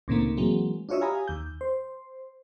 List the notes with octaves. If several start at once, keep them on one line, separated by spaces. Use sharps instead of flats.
C#2 A2 C3 D#3 A#3
E3 F#3 G#3 A#3 C4
D4 F4 F#4 C#5 D#5 E5
G4 F5 G#5 A#5 B5 D#6
D#2 G6
C5